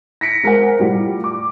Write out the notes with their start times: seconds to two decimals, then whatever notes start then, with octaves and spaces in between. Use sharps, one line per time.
0.21 A#6 B6 C#7 D7
0.43 G#3 A#4 C5 F#5
0.79 A2 G3 F4
1.24 D6